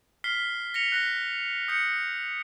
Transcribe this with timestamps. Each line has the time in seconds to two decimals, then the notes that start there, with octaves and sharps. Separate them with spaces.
0.24 F6 B6 C7 G7
0.74 A#6 C#7 F7
0.92 F#6 A#6 B6
1.68 D#6 G6 C#7